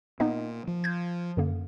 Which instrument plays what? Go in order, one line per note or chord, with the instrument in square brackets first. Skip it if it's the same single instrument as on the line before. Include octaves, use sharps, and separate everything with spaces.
[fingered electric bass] A#2 [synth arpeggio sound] B3 D#4 D#5
[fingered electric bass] F3
[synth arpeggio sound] G6 G#6
F#2 D3 A#3